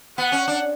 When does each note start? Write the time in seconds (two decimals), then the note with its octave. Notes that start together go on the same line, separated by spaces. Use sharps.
0.18 B3 F#5
0.32 C#4
0.48 D4